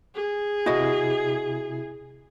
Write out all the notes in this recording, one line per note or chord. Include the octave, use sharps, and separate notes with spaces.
G#4
C3 E4 F#4 D#5